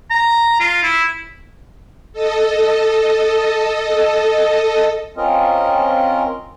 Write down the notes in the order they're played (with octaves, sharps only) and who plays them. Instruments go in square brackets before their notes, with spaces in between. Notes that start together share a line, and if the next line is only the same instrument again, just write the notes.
[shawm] A#5
F4
E4
[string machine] A4 D#5
[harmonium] C4 C#4 F4 A#4 D#5